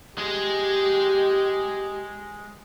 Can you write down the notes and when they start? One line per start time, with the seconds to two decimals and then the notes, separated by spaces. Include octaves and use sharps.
0.18 G#3 G4 G#4